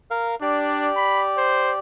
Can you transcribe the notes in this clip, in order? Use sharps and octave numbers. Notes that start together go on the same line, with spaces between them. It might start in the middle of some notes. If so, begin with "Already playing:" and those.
A#4 F5
D4 G4 D5
B5
C5